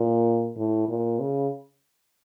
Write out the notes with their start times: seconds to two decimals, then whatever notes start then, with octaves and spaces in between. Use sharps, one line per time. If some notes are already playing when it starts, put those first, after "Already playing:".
Already playing: A#2
0.57 A2
0.89 A#2
1.20 C#3